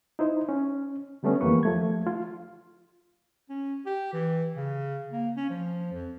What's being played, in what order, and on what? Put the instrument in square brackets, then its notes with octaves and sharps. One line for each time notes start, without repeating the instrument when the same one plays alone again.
[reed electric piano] D#4 E4 C5
C#4
D3 G3 A3 B3 C#4
F2 E3 A#3 G4 B4 C#6
F3 A3 G#6
F4
[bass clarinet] C#4
G4
E3
C#3
A#3
C#4
F3
F2